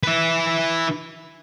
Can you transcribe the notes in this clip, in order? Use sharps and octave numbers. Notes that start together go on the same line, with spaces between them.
E4 B4